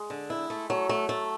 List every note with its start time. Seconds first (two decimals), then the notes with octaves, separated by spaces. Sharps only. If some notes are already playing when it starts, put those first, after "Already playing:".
Already playing: G#3
0.10 D3
0.30 E4
0.50 A3
0.70 F#3 A3
0.89 A3
1.09 A3